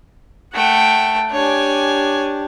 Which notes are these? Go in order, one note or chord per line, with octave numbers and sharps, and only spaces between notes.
A3 F#5 G5
D4 G4 C#5 G#5